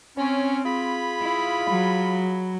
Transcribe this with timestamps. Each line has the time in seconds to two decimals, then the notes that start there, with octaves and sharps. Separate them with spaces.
0.17 C4 C#4
0.65 F4 G#4 B5
1.22 E4
1.69 F#3